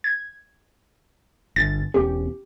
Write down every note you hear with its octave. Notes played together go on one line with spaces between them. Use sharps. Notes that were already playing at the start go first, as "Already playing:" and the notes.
G#6
G1 A6
E1 B3 C#4 G4